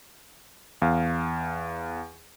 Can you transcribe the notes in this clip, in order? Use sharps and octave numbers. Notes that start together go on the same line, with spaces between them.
E2 F5